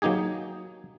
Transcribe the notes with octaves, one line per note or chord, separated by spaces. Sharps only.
F#3 A#3 D#4 G4 G#4